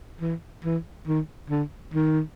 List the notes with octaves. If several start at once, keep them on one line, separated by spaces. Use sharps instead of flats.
E3
E3
D#3
D3
D#3